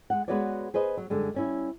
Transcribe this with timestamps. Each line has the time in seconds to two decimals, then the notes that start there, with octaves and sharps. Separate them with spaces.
0.10 G#3 F#5
0.28 G#3 B3 F#4 B4 C#5 D5
0.74 G#4 B4 C5 D#5
0.97 F#3
1.10 F#2 D3 G3 G#3
1.34 G3 C#4 E4